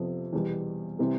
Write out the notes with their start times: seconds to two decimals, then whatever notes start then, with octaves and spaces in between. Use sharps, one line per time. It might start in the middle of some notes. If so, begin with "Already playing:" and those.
Already playing: F2 C3 F3 B3
0.33 E2 B2 G3
0.99 C3 E3 G3